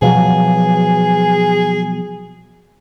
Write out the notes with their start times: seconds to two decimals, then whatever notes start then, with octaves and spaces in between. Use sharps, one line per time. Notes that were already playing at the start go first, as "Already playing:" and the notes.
0.02 B2 F3 F#3 G#4